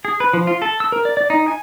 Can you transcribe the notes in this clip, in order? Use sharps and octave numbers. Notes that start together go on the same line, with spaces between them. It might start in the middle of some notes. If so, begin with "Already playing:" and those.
G#4
B4
F3
F4
A4
E6
A#4
D5
D5
D#4
G#5